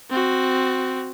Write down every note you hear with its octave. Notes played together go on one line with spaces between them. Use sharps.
C4 F#4